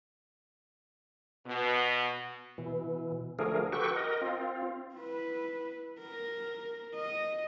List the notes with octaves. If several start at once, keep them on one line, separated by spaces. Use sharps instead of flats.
B2
B2 E3
D3 F3 A3 G#4 A#4
F#4 G4 A4 B4 G5 C#6
A#4 D#5
C4 F4
E4 B4
A#4
D#5